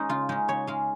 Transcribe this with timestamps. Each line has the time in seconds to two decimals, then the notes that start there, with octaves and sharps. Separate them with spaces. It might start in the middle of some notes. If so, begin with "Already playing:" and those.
Already playing: G#3 C#4 D#4
0.09 C#3 F4
0.29 G#3 C#4 D#4
0.48 C#3 C#5
0.67 G#3 C#4 F5